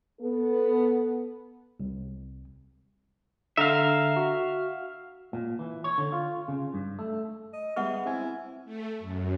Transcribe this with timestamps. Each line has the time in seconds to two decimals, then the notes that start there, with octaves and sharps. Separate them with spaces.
0.21 B3 A4
1.80 C2
3.57 D3 E5 F5 A#5
4.16 F#4
5.33 A#2
5.59 E3
5.84 C#5
5.98 D3
6.12 F4
6.48 C#3
6.74 G2
6.99 A3
7.53 D#5
7.76 G3 G#3 B3 G#4 E5 F#5 F6
8.06 C4 E4 G#5
8.65 A3
8.98 F#2